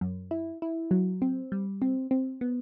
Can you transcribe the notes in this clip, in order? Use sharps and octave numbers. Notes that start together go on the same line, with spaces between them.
F#2
E4
E4
F#3
C4
G3
C4
C4
B3